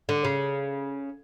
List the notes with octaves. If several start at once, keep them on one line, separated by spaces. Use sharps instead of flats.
D3
C#3